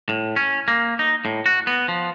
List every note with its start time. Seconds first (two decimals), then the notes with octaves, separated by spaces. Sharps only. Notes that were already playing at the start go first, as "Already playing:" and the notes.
0.09 A2
0.36 C#4
0.68 A#3
0.99 D#4
1.25 A2
1.46 F#4
1.67 B3
1.88 F3